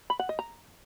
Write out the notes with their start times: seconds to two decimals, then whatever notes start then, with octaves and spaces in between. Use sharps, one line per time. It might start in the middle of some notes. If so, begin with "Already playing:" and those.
0.10 B5
0.19 F#5
0.29 D#5
0.39 A#5